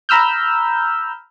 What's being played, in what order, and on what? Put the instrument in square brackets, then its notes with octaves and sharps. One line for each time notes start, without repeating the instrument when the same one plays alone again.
[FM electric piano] A#5 B5 E6 F6 G6